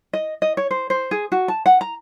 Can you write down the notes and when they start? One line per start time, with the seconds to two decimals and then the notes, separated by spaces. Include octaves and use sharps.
0.13 D#5
0.42 D#5
0.57 C#5
0.71 C5
0.90 C5
1.11 G#4
1.32 F#4
1.48 A5
1.66 F#5
1.81 A#5